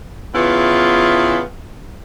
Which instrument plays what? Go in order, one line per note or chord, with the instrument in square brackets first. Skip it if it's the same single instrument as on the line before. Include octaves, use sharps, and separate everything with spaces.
[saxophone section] E2 C#3 B3 E4 F4